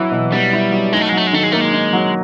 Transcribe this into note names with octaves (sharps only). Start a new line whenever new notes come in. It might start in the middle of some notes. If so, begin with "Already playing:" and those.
Already playing: E3 F#3 E4
B2
G3 B3
E4
F#3
G#3 D#4
A3
F#3 G#3
A3
G#3
D#3 A3
G#3
A3 A#3
G#3
D#4
F#3